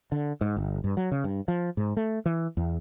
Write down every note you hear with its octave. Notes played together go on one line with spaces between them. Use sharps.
D3
G#2
G1
G2
F#3
C#3
G2
F3
G#2
A3
E3
E2